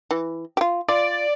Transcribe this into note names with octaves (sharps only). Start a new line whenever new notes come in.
E3
F4 G4
F4 D5